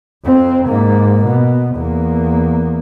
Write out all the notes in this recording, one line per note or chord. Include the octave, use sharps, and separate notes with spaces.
F2 C4
G#2 A#3
B2
E2 A#3